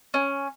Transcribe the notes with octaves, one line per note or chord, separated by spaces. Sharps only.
C#4